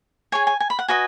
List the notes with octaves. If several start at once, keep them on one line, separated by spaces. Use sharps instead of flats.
G#4 C#5 G#5
G#5
G#5
B5
F#5
F#4 B4 D#5 G#5